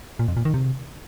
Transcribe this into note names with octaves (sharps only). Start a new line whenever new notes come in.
A#2
F2
A#2
D#3
C3